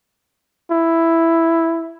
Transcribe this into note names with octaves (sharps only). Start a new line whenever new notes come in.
E4